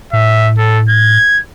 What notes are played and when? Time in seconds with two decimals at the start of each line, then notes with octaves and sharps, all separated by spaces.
0.13 A2 E5
0.58 A4
0.90 G#6